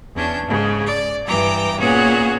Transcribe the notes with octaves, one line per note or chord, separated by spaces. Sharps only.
E2 C#4 D4 G6
G#2 C#3
D5
G2 E3 G5 A#5 D6
A#2 B3 C#4 F#4 G#4